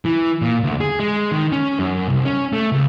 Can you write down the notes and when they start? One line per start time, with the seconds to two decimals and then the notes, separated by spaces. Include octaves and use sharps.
0.05 E3
0.42 A#2
0.64 D2
0.80 G#4
1.00 G#3
1.32 D#3
1.52 C#4
1.79 F#2
2.09 C2
2.25 C#4
2.53 A3
2.72 C#2